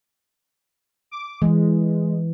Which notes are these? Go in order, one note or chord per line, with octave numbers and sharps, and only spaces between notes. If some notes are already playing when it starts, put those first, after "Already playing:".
D6
E3 G#3